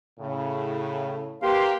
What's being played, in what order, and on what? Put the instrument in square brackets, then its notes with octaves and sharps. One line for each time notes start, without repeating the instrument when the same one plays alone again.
[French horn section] A2 C#3
[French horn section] A#3 G4 [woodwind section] B4 F5 C6